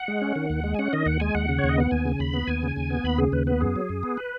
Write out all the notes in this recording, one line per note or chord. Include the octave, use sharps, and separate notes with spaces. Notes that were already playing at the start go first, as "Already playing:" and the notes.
Already playing: F#5
G#3
C#4
D#3
D#2
G#3
G#5
C#4 F#5
D#3 D#5
D#2 F#5
G#3 G#5
D#2 F#5
C#3
C#5
D#2
D#5
B3 F#5
D#2 G#5
C#3
D#2 B5
B3
D#2 G#5
C#3
D#2
B3
D#2 B5
C#3 G#4
D#2 B4
B3 B4
F#2 G#4
F#3
F#2
B3
B4